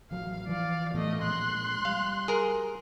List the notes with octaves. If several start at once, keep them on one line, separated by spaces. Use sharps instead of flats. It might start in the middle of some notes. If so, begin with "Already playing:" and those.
A1 F3 F#3 F5
E3 F3 D5 F5
A2 E3 A3 B3 D#5
A#2 F3 G#3 C6 F#6
G3 F5
G#4 A#4